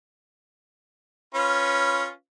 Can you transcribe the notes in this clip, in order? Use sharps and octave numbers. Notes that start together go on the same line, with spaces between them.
C#4 F4 B4